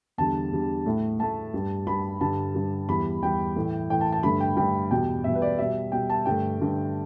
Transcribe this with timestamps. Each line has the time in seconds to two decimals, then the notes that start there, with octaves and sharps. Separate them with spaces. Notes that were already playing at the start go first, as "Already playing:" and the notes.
0.18 E2 D3 G3 A5
0.52 E2 D3 G3
0.86 A2 A3
1.19 A2 A3 A5
1.54 G2 G3
1.87 G2 G3 B5
2.21 G2 D3 G3 A5
2.54 G2 D3 G3
2.88 E2 E3 G3 B5
3.22 E2 E3 G3 G5
3.56 A2 E3 A3
3.90 A2 E3 A3 G5
4.01 A5
4.12 A5
4.23 G2 D3 A3 B5
4.40 G5
4.57 G2 D3 A3 G5
4.91 E2 B2 G3 G5
5.24 E2 B2 G3 E5
5.35 B4
5.42 D5
5.58 B2 G3 E5
5.92 B2 G3 G5
6.10 A5
6.26 G2 D3 A3 G5
6.59 G2 D3 A3